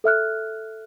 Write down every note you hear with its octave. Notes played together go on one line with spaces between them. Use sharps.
A4 E5 F6 F#6